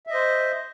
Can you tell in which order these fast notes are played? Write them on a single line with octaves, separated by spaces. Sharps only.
E5 D#5 C5